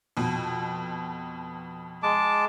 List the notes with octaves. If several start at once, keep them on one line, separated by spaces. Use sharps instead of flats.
F2 B2
G#3 A5 D6